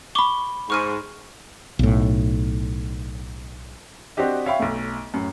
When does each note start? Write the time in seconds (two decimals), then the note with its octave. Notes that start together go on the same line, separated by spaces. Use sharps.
0.15 B5 C#6 D6 G7
0.70 G#2 C#6 F6 D#7
1.79 B1 A2
4.17 C4 D4 F#4 G4 D#5
4.46 C#5 E5 F5 G5 B5 C#6
4.60 B1 A3
5.14 F#2 A2